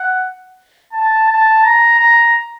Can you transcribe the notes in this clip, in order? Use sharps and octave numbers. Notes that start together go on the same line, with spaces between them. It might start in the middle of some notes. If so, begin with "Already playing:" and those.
Already playing: F#5
A5
A5
A#5
A#5